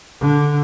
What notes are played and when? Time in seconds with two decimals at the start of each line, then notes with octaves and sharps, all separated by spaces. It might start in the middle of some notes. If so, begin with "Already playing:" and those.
0.20 D3